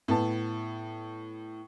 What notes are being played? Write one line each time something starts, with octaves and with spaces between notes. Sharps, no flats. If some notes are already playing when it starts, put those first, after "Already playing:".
A2 B3 A5